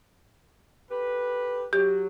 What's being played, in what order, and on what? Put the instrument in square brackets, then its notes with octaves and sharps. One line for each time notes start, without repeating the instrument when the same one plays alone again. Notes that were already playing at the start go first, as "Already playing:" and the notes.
[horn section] G4 A4 B4
[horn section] F#3 [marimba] G4